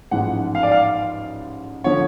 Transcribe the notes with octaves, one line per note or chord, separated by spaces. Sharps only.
A1 G#2 F3 F#5
F5
D5
F5
D3 F3 C#5